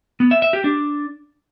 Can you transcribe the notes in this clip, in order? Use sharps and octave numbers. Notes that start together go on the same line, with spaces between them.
B3
E5
E5
G4
D4